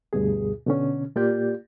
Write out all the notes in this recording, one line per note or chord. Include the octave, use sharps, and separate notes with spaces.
D2 G2 B2 G#4
B2 D3 C#4
A#2 A#3 F4 G4 D5 G6